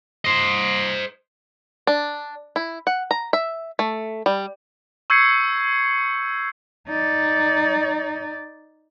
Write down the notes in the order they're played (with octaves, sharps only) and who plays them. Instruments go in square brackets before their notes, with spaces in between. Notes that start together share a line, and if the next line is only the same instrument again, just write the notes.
[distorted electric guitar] C5 D#5
[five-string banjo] D4
E4
F#5
A#5
E5
A3
G3
[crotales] C#6 E6 G6 G#6 C7 C#7
[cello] D#4 D5